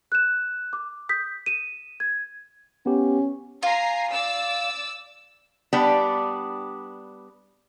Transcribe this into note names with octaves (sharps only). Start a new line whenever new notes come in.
F#6 E7
D6
D#6 G6 B6
D#7 E7
G#6
B3 C#4 G4
F4 G#5 A#5 C7
D5 E6
G3 B3 D4 G4